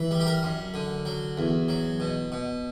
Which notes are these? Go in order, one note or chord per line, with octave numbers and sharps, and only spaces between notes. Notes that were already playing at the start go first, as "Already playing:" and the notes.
Already playing: E3 B4
G3
G4
A#4
F#2
D3
F#3
E2
F#3
B2
B2